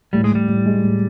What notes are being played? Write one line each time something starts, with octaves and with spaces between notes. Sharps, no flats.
A2 G3
G#3
A2 G3
A2
G#3
A2